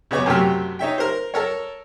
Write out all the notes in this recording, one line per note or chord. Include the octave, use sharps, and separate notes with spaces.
C#3 B3 C#5 C#6 D6
F#2 C3 A3 G4 G5 F6
D#4 C#5 E5 G5
A#4 C5
A4 A#4 C#5